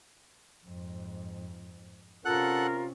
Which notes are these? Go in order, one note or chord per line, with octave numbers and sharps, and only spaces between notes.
F2 G#2
C3 C#4 F4 A4 A#4 F#5 F#6